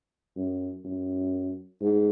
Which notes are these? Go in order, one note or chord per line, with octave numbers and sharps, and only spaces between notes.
F#2
F#2
G#2